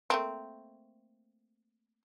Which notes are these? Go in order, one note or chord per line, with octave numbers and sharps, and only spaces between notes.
A3 A#3 C4